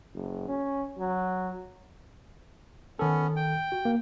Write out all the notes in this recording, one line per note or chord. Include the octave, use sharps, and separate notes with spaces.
F#1
C#4
F#3
D#3 B3 C#4 A4
G5
F#4
A#3